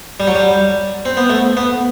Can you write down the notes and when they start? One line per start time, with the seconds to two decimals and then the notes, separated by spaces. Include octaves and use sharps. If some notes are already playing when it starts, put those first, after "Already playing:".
0.20 G3
0.27 F#3
0.35 G3
1.05 C4
1.17 B3
1.30 A3
1.57 B3